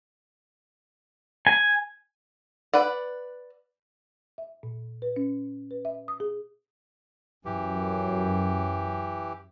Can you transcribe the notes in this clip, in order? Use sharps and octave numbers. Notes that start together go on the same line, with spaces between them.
G#5
B4 D5 F#5
E5
A#2
B4
C#4
B4
E5
D#6
G#4
F#2 E3 G4